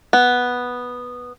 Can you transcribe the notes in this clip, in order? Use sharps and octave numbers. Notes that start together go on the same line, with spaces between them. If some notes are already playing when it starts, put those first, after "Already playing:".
B3